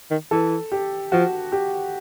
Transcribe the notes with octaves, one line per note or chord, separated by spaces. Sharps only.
D#3
E3 A4
G4
F3 F#4
G4